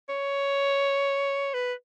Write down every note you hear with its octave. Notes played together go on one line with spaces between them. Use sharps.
C#5
B4